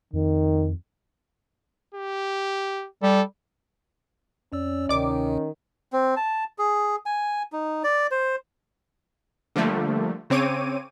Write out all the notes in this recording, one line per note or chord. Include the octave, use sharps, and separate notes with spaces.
F2 D#3
G4
G3 A4
F2 C#4 D5 E6
D2 C3 D#3 D5 D6
C4
A5
G#4
G#5
D#4
D5
C5
D3 F3 G3 A3 A#3
C#3 C4 C#5 D6 D#7